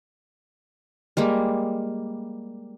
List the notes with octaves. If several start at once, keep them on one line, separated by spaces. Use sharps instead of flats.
G3 G#3 A#3